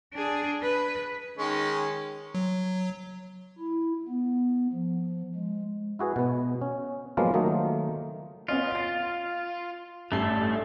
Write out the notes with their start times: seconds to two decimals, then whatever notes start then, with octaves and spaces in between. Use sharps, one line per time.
0.14 D4 G#4
0.62 B4
1.38 D#3 G#3 C#4
2.35 F#3
3.58 E4
4.08 B3
4.73 F3
5.35 G#3
5.99 E4 F#4 G#4 B4
6.16 B2 B3
6.61 C#4
7.17 F3 F#3 G#3 A#3 B3 F4
7.34 D#3 F#3 A3 A#3 D#4
8.48 B3 C#4 F4 D#5
8.71 A6 D7
10.12 A1 G2 A3 C7